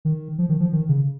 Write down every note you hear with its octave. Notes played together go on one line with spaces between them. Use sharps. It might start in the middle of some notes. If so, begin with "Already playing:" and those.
D#3
F3
D#3
F3
D#3
C#3